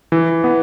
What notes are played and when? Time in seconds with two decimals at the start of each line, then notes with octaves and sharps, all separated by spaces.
0.12 E3
0.44 B3